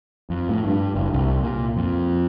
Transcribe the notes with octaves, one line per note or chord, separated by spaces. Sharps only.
F2
A2
G2
F#1
C2
A#2
F2